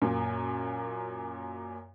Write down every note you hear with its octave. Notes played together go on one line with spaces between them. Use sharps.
F#2 A#2